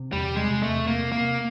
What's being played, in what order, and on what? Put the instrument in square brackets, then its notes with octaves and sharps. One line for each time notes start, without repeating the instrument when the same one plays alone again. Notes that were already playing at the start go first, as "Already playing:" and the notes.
Already playing: [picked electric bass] C3
[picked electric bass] E2 [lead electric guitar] G3
[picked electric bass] C3
[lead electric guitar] G#3
[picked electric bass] C3
[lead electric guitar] A3
[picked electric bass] E2
[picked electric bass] C3 [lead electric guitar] A#3
[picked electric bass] C3
[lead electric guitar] A#3